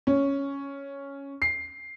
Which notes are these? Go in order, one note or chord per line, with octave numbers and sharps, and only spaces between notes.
C#4
C7